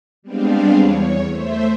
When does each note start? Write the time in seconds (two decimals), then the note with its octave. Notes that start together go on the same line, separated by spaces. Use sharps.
0.22 G3 G#3 B3 C4 D4 F5
0.75 E2 C#5
1.28 A3 C5 E5